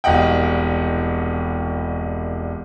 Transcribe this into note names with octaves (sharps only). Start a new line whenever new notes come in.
E1 C2 D#5 F#5 G5